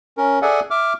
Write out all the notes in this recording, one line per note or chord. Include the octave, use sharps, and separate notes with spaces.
C#4 A#4
G#4 A4 D5 E5 F#5 G#5
E5 D6 F6